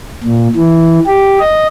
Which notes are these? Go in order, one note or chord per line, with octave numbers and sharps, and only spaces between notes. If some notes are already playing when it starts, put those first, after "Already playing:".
A#2
E3
G4
D#5